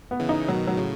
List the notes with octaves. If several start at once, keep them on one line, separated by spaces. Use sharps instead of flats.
B3
C#3 E3
D#4
B2 D#3 F#3
F#3
A2 C#3